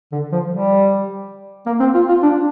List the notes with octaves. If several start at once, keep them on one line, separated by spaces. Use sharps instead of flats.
D3
F3
G3
A#3
C4
F4
F4
D4